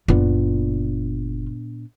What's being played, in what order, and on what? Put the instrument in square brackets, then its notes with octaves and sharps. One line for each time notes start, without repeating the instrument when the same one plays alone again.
[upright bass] F#1 F4 [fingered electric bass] A#2 B3 D4